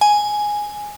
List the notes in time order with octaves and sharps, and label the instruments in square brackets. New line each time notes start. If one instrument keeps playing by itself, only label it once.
[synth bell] G#5